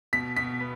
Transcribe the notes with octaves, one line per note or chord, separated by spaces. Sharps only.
B2 B6
B2 B6
B3